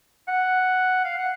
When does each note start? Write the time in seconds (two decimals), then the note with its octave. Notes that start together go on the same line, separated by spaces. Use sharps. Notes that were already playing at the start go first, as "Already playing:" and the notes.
0.28 F#5
1.04 F5
1.18 F#5